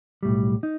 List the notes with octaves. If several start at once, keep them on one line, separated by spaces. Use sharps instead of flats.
B1 A2 G3
D#4